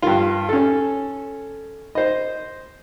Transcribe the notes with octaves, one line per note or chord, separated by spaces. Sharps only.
G2 F4
C#4 A4
C5 D#5